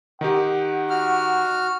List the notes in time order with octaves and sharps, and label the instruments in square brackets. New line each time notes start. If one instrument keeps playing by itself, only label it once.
[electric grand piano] D#3 D#4 G4 [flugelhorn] F#5
[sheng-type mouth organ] F#4 F6